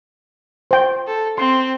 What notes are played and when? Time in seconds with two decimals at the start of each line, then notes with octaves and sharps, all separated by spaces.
0.71 C5 G5
1.07 A4
1.38 C4 C6